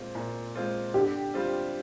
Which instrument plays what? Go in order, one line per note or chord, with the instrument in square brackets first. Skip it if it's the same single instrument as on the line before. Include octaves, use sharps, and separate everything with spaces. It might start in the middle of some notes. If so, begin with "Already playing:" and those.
Already playing: [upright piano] A#2 G#3 C4 F4
A#2
G#3 C4 F4
[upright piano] D3 [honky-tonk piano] G4
[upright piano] G3 C4 F4